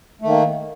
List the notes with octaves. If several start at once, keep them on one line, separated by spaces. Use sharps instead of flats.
D#3 A3 A#3